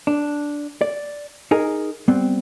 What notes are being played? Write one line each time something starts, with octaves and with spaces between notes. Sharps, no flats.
D4
D5
D#4 G#4 A#4 G#5
G3 B3 C4